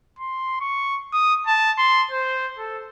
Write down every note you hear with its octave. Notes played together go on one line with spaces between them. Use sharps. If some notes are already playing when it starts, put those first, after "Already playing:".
C6
C#6
D#6
A5
C6
C5
A4